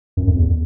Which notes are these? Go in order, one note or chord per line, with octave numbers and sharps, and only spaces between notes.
F#2
F2
E2